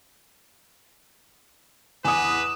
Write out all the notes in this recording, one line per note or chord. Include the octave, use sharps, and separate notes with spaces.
E2 B4 G#5 D6 D#6 E7